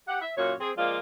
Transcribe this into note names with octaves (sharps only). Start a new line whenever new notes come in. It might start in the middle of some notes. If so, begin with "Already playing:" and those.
G4 F#5
E5
F#2 A#2 F#4 C#5
C4 G#4
F3 G#3 A#3 F4 D5